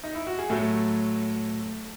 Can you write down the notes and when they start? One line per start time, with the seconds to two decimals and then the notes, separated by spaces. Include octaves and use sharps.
0.03 D#4
0.15 E4
0.27 F#4
0.39 G#4
0.50 A2 F#3 A3 A4